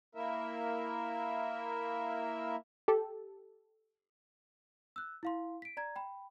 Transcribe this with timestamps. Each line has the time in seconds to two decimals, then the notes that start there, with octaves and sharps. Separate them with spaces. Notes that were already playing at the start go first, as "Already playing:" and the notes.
0.15 A#3 E4 A#4 E5
2.88 G4 A4
4.96 E6 F#6
5.23 E4 F5 C6
5.62 B6 D7
5.77 D5 A#5 G#6
5.96 G5 B5